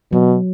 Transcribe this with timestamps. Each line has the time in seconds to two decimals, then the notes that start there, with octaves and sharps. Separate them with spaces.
0.12 B2 F#3